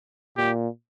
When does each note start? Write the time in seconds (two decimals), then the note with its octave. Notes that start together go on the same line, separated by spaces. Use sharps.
0.37 A#2 G4